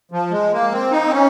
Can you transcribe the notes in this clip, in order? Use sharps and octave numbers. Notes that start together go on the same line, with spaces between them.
F3
G#3
A#3
C4
D#4
C4
C#4